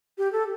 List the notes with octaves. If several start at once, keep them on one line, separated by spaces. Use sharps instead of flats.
G4
A4